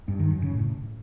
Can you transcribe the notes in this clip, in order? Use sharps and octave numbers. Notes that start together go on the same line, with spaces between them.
G2
D#3
F#2
C#3
A2